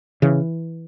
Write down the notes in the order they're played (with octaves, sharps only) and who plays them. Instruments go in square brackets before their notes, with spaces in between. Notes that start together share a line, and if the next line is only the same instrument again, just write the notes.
[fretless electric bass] C#3 E3